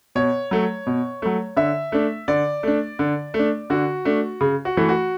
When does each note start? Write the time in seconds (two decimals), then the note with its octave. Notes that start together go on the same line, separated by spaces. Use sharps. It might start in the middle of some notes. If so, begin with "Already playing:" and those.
0.15 B2 C#5
0.51 F#3 A3
0.87 B2
1.22 F#3 A3
1.57 D3 E5
1.92 A3 D4
2.28 D3 D5
2.63 A3 D4
2.99 D3
3.34 A3
3.39 D4
3.70 D3 F#4
4.05 A3 D4
4.41 C#3
4.65 F#4
4.77 E3 A3
4.89 F#4